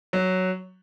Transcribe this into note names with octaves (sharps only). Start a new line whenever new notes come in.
F#3